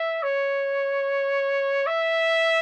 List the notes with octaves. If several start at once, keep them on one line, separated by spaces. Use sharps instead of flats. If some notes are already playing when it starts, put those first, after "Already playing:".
Already playing: E5
C#5
E5